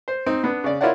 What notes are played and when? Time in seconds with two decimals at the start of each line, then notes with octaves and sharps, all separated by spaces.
0.08 C5
0.26 C4 D#4
0.44 B3 D4
0.64 C#3 D5
0.81 E4 F4 A#4 C#5 D5 F#5